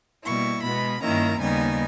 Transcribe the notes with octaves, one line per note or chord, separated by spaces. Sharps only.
B2 G3 A#3 E4 C#6
B2 G#3 B3 B5
G2 D#3 A#3 C#4 E4 A#5
D#2 C#3 G3 B3 D#4 G#5